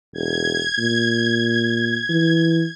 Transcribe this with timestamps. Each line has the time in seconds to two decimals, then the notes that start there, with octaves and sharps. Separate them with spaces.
0.13 E1 G#6
0.78 A#2
2.10 E3